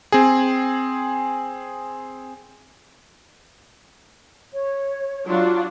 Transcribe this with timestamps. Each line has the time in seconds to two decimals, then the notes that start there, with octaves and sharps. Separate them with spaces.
0.12 C4 G#4
4.53 C#5
5.27 F#3 D4 F4